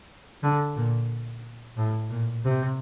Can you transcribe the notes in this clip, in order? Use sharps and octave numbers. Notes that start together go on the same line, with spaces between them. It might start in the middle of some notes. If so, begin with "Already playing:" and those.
D3
A#2
A2
A#2
C3